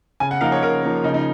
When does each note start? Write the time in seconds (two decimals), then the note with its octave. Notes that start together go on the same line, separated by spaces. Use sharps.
0.20 C#3 G#5
0.31 F#5
0.41 F3 A#3 D#4 A#4 F5
0.52 C#5
0.63 C#3 A#4
0.82 F3 A#3 D#4 A#4
1.04 C#3 D#4
1.14 D#4